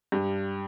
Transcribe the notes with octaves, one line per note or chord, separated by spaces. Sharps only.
G2